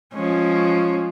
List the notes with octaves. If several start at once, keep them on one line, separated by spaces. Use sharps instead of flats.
F3 G#3 C#4